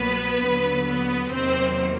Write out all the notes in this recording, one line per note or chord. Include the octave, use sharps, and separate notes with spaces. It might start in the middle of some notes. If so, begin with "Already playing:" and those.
Already playing: C2 B2 F#3 A#3 B3 B4
D#2 D3 F#3
B3 B4
E2 C3 D#3 F#3 A#3 C4 C5